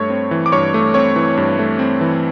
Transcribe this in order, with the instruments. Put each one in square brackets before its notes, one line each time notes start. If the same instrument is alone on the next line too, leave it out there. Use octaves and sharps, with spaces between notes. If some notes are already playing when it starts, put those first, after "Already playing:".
Already playing: [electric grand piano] G2 A3 C#5 C#6
C4
E3
D6
G2 C#5 C#6
A3
C4 C#5 C#6
E3
G2
A3
C4
E3